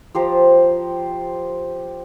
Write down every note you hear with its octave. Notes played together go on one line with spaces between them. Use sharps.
F3 G4 C5 A#5